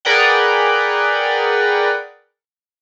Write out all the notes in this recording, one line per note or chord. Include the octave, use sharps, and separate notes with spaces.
G#4 A#4 B4 D5 F#5 G5